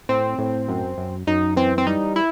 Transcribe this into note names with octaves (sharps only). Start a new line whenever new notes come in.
A2 C4
A2
F#2
F#2
F#2 D#4
E3 C4
C4
G3 D#4
E4